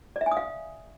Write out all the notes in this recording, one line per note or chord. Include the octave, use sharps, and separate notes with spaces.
D5
E5
G#5
D#6
F5